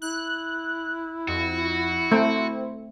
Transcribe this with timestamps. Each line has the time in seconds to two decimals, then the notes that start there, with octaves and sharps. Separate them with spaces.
0.02 E4 F#6
1.28 F2 F#4
2.12 A3 C4